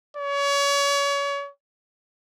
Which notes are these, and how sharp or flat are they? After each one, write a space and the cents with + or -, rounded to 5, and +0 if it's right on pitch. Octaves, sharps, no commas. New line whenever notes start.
C#5 +30